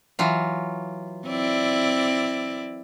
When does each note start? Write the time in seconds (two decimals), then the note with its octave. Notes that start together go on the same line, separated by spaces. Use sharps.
0.19 E3 F#3 F4
1.27 C4 E4 D5